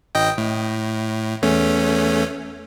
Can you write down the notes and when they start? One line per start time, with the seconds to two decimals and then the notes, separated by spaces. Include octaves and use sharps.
0.15 A1 D#5 G5
0.38 A2
1.42 E2 A3 C#4